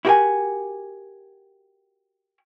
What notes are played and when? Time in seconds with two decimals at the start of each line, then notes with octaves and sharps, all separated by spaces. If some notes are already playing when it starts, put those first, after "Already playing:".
0.05 E4 F#4 G4 A#4 F#5 G#5